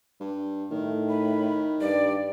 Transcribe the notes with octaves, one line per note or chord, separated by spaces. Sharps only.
G2
A2 D#3
B5
G2 D5